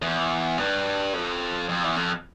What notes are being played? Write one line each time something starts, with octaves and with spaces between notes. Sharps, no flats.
E2
G2
F2
F2
E2
F2